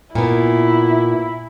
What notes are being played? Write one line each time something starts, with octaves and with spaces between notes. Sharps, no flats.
A#2 B3 E4